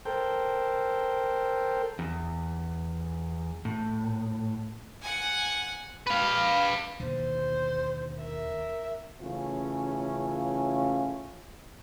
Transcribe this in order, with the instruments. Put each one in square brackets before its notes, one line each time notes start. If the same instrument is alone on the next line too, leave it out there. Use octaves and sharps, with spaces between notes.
[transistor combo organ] A4 A#4 C5 G5
[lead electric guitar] E2
A2
[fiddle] F#5 G#5
[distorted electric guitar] B4 F5
[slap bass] D#2 B2 D3 [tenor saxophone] C5
[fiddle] A#4 E5
[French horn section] C#3 E3 A3 C#4 F4